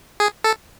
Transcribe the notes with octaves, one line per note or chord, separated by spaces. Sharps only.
G#4
A4